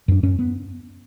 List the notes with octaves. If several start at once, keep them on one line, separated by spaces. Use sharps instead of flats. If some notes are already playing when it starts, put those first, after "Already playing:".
F#2 D4
F#2 C#4
B3